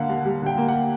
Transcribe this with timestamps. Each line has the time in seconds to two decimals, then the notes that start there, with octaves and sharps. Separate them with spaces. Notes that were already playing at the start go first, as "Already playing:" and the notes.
Already playing: D3 A#3 F5 F#5
0.09 D#2
0.25 G3
0.42 D3 G5
0.57 A#3
0.68 F#5